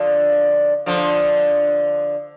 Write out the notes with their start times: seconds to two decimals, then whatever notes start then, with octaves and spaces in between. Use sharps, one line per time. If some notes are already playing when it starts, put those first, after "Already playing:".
Already playing: D3 F3
0.86 D3 F3